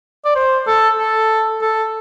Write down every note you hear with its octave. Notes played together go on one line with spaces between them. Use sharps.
D5
C5
A4
A4
A4